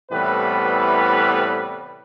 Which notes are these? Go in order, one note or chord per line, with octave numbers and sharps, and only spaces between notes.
A2 C3 E3 G3 B3 B4